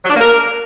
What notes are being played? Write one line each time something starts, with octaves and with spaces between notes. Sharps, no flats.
F#3
D4
A#3
A#4